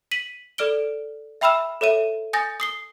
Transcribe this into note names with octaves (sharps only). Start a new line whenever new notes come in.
B6 D#7 F#7
A4 D5 F6 D7 G7
E5 G5 B5 E6 F6 E7
A4 C#5 E5 D#7
G#5 D#6 G6 A6 A#6
D#6 C7 G7